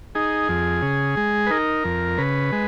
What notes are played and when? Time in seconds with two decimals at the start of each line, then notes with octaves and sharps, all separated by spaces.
0.15 D#4 G#4
0.49 F2
0.82 C#3
1.17 G#3
1.47 B4
1.50 D#4 A#4
1.85 F2
2.18 C#3 B4
2.52 G#3